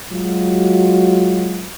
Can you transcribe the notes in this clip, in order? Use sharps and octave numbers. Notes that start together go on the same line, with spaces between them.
F#3 G#3 F4 F#4